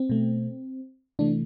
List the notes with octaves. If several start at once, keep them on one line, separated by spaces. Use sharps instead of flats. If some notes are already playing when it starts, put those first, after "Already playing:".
Already playing: C4
B2 A3
C3 E3 A3 D4